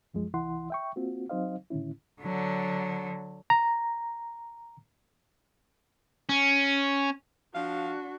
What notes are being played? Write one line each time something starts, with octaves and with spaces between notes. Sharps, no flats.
C2 F#2 F3 G#3
C2 E3 E4 F#5 C6
E5 G5 C#6
A#3 C4 F4 F#4
F#3 C4 D#4 C5 D#5 F5
A2 D3 D#3 C#4 E4
D3 F#3
A#5
C#4
F3 D4 F#4 F5